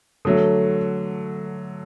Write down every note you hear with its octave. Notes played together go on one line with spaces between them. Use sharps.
D3 F#3 A3